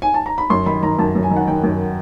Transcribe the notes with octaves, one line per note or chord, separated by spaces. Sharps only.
G#5
A5
A#5
B5
F#2 C6
D#3 B5
D#3 A#5
F#2 A5
F#2
G#5
D#3
F#5
D#3 G5
F#2